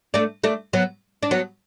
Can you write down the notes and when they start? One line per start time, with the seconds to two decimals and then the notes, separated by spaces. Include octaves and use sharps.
0.14 A3 D4
0.44 A3 D4
0.73 F#3 B3
1.23 D4
1.31 F#3 B3